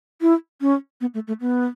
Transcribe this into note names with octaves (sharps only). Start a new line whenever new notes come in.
E4
C#4
B3
A3
A3
B3